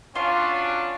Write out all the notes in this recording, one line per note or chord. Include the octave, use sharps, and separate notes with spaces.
F#3 C#4 D4 F4